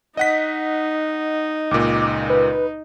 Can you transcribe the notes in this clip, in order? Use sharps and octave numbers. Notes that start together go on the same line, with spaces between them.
D#4 D#5 F#5 B6
C#2 A#2 D6
B4